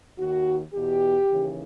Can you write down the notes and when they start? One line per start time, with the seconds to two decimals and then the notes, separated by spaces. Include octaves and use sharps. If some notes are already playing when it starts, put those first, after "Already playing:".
0.18 D#2 D#3 F#4
0.73 E2 B2 G4
1.29 D#2 C#3 E3